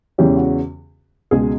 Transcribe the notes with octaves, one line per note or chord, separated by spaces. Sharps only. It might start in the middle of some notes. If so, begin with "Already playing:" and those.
E2 C#3 E3 G#3 C#4 G4
F#4
C#2 B2 G#3 G#4